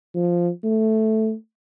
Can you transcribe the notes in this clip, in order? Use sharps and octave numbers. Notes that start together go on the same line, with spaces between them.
F3
A3